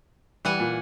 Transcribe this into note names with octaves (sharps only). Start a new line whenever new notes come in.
E3 G3 F#5 G#5
A#2